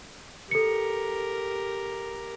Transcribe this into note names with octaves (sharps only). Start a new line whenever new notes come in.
G4 A4 A#4 C#7